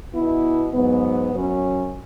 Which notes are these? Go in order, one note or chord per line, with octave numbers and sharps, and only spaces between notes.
B2 B3 E4
G#2 F#3 B3
F#2 F#3 C#4